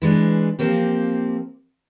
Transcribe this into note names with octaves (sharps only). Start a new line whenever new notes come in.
E3 G#3 D4
F3 A#3 C4 G4